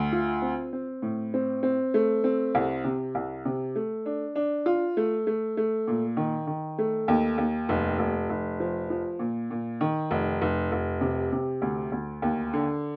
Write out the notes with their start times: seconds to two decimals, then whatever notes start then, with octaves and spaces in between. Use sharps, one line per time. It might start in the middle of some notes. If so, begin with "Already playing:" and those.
Already playing: D2
0.12 F4
0.42 C4
0.73 C4
1.02 A2
1.34 C4
1.63 C4
1.94 A3
2.24 C4
2.55 C2
2.84 C3
3.15 C2
3.45 C3
3.76 A3
4.06 D4
4.36 D4
4.66 F4
4.97 A3
5.27 A3
5.57 A3
5.87 A#2
6.17 D#3
6.47 D#3
6.78 A3
7.08 D#2
7.38 D#2
7.69 F1
7.99 F1
8.30 F1
8.60 F3
8.90 F3
9.19 A#2
9.51 A#2
9.81 D#3
10.11 F1
10.42 F1
10.72 F1
11.01 C3
11.32 C3
11.62 D2
11.92 D2
12.22 D#2
12.53 D3